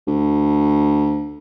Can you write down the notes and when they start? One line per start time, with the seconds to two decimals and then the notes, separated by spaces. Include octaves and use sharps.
0.07 D2